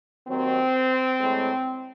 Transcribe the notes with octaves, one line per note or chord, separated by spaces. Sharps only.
D#2 D#3 F#3 C4
A2 G#3